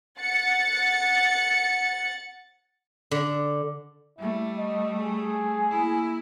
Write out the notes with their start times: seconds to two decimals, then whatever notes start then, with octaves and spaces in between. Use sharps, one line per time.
0.19 F#5 A6 C#7
3.11 D3
4.19 G3 A3 E4
4.57 D#5
4.97 G#4
5.71 A#3 E4